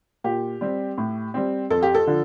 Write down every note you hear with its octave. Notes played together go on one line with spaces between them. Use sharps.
A#2 G4
G3 C4
A2
G3 C4
F2 A4
G4
A4
D3 F3